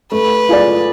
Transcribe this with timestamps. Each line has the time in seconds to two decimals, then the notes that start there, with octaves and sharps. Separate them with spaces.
0.12 A3 B4
0.49 F4 G#4 D5